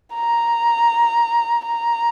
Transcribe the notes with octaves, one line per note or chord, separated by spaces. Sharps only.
A#5
A#5